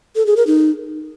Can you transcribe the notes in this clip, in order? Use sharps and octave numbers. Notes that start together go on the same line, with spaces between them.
A4
G#4
A#4
D#4